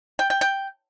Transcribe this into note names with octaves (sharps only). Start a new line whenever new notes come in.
G5
G5
G5